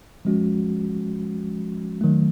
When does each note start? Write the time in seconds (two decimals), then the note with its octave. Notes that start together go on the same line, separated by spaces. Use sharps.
0.25 F3 G#3 C#4 F#4
2.01 D#3 F#3 A3